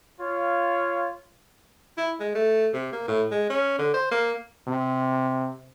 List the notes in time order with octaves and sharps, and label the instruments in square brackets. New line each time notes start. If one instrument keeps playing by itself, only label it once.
[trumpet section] F4 C#5 F5
[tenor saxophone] E4
G#3
A3
C3
A#3
A2
G#3
C#4
D3
C5
A#3
[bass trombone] C3